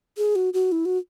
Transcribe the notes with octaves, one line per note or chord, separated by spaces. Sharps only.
G#4
F#4
F#4
E4
F#4